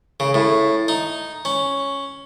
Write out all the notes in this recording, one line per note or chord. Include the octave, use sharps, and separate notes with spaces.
C#3
A2
D#4
C#4